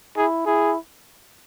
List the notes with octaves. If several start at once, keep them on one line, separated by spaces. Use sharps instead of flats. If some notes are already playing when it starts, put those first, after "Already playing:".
E4 G#4
E4 G#4